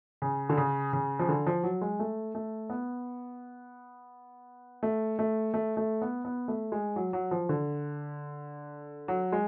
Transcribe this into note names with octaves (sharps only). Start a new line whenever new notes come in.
C#3
D3
C#3
C#3
F3
D3
F3
F#3
G#3
A3
A3
B3
A3
A3
A3
A3
B3
B3
A3
G#3
F#3
F#3
F3
D3
F#3
G#3